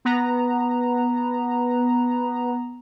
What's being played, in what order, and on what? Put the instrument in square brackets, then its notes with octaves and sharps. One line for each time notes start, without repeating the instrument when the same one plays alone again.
[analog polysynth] B3 A#5